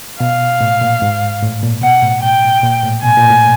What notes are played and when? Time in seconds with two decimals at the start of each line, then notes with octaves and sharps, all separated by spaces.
0.20 B2 F5
0.61 A2
0.81 A#2
1.02 G#2
1.42 A2
1.63 A#2
1.82 B2 F#5
2.03 A2
2.23 G5
2.63 A#2
2.83 A2
3.03 B2 G#5
3.17 A#2
3.30 A2